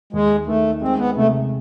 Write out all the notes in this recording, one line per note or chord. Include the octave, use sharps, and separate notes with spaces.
D#2 G#3
D#3 A3
G#3 C4
B3
C3 A3